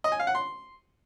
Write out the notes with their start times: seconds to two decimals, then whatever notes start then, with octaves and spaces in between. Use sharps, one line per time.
0.04 D#5
0.12 G#5
0.20 F5
0.27 F#5
0.35 C6